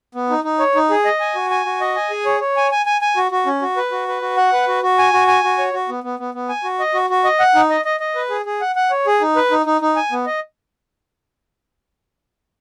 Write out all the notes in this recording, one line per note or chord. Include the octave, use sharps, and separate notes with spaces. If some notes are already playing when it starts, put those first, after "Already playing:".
B3
D#4
D#4
C#5
D#4
G#4
D#5
G#5
F#4
G#5
F#4
D#5
G#5
G#4
C#5
C#5
G#5
G#5
G#5
G#5
F#4
F#4
C#4
F#4
B4
F#4
B4
F#4
F#5
B4
F#4
F#4
G#5
F#4
G#5
F#4
C#5
F#4
B3
B3
B3
B3
G#5
F#4
D#5
F#4
F#4
D#5
F#5
D#4
D#5
D#5
D#5
B4
G#4
G#4
F#5
F#5
C#5
G#4
D#4
B4
D#4
D#4
D#4
G#5
B3
D#5